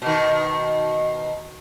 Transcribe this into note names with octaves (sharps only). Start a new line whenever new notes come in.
B2 D#3